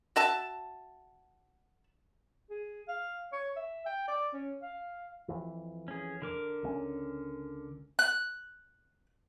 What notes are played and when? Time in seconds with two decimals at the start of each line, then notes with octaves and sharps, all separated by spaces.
0.16 F#4 E5 A5
2.50 G#4
2.88 F5
3.33 C#5
3.56 E5
3.86 G5
4.08 D5
4.33 C#4
4.62 F5
5.28 F2 E3
5.88 C#4 G#4
6.22 D3 A#4 D6
6.63 C#2 A3 C#4
7.99 F#6